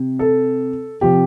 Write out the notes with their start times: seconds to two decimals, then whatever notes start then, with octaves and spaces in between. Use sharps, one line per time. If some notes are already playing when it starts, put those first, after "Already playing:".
Already playing: C3
0.19 A4
1.01 C3 F3 G4